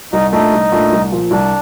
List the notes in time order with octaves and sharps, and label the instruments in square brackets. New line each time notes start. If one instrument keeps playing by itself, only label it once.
[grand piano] C2 [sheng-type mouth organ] D#4
[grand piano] A#2 A3 D4 [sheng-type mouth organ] D#4
[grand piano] C2
A#2 A3 D4
C2
A#2 F3
[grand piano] C2 [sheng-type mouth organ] D4